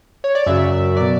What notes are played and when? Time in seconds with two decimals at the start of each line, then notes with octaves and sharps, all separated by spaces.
0.24 C#5
0.35 D5
0.46 F#2 C#3 F#3 E5
0.96 B2 F#3 D5